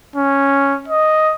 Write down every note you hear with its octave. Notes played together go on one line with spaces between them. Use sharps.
C#4
D#5